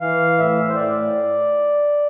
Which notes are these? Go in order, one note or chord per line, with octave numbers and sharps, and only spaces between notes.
E3 F5
A2 E5
C5
A2 D5